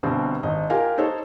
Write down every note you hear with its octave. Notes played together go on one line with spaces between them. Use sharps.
G1 G2 B2 C4
G#1 D#5
F4 G4 A#4 F5 G#5
D#4 A4 C5 C#5